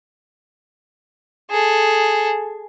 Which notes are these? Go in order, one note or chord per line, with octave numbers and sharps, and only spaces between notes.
G#4 A4